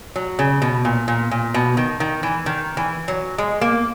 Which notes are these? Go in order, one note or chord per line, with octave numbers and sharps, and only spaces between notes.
F#3
C#3
B2
A#2
A#2
A#2
B2
D#3
D#3
E3
D#3
E3
F#3
G#3
A#3